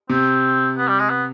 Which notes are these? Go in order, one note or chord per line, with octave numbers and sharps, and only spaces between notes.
C3 C4
B3
G3
G#3
B3